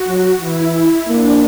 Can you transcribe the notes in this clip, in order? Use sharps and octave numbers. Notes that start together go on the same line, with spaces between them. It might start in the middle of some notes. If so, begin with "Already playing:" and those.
Already playing: F#4
F#3
E3 E4
A#3 D4